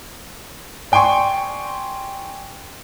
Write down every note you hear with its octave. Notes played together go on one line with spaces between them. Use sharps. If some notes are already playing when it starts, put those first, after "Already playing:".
D5 G5 G#5 C6 C#6